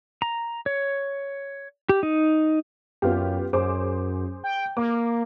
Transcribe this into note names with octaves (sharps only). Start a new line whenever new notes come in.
A#5
C#5
G4
D#4
F#2 B3 F4 G4
F#2 G#4 C5 D6
G5
A#3 D6